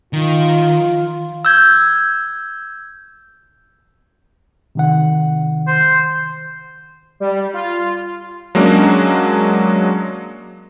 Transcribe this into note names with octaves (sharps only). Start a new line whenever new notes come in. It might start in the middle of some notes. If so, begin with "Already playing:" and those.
D#3 F4
E6 G6 G#6
C3 D#3 F#5
C5
G3
F4
F#3 G#3 A#3 C#4 D4